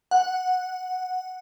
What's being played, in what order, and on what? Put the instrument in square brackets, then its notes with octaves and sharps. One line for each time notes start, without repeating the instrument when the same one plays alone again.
[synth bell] F#5